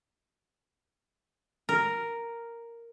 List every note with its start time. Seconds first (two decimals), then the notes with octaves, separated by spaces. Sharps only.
1.69 A#4